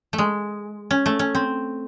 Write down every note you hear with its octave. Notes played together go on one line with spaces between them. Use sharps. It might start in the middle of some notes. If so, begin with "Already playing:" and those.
A3
G#3
C#4
A3
C#4
C4